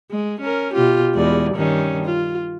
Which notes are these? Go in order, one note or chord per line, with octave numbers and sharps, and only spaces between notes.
G#3
C#4 A#4
B2 F4 G4
E2 G#3 D5
G2 D#3 C#4
F4